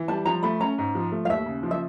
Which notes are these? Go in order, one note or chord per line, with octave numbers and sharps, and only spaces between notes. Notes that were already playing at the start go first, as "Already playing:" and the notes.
Already playing: E3
G3 A5
F3 A#5
A3 B5
C#4 A#5
G#2
F3
A3
F5
D#2 E5
C#3
F3
E5